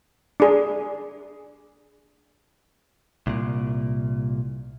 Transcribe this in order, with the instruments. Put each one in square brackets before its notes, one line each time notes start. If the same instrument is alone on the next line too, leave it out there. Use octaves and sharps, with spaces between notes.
[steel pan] D4 G#4
[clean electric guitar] C2 A#2